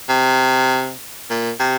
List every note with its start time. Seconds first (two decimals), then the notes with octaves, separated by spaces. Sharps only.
0.09 C3
1.30 A#2
1.60 C3